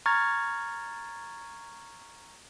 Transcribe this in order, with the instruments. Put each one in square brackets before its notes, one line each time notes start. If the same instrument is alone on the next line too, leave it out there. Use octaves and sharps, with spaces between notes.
[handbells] A#5 C#6 F6 G#6 A6